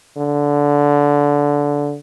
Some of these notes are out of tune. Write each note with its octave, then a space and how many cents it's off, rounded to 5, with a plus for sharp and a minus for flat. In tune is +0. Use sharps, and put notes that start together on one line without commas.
D3 -15